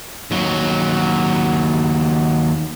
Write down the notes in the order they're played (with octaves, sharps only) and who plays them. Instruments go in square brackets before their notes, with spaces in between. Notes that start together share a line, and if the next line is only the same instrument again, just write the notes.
[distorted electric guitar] D#2 F#3